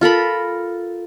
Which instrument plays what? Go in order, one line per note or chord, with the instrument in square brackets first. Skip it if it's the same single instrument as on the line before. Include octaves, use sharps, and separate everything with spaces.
[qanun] F4 A4 A#4 B5